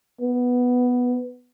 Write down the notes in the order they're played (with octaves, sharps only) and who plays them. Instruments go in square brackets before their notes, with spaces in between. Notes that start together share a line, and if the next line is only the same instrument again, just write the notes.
[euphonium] B3